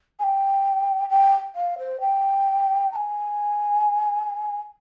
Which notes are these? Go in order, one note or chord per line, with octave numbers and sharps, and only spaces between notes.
G#5
G5
G5
F5
C5
G5
A#5
G#5